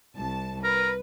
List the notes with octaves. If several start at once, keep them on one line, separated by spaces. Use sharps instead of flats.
C2 A5
A#4 B4